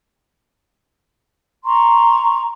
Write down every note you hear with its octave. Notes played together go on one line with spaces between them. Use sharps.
A#5 C6 C#6